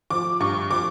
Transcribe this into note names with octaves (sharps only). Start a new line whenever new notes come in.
F3 D6
G2 C#6
F3 D6